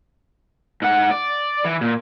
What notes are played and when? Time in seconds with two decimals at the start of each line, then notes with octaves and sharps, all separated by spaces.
0.82 G#2 F#5
1.11 D5
1.65 E3
1.81 A#2